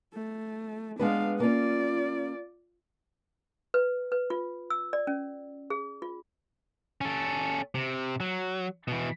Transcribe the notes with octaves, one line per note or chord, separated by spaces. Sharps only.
A3
G#3 B3 D4 B4 F5
A#3 C#4 F4 D5
B4
B4
F4
E6
D5
C#4
G#4
F4
C#4 A4
C3
F#3
B2 E3